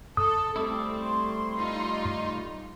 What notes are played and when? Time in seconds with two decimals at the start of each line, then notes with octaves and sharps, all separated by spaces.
0.17 A4 D#6
0.56 G3 A3 C4 E4
1.02 C6
1.57 D#4 F4